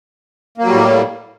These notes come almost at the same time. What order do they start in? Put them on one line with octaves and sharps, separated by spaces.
A#3 F#3 G3 A2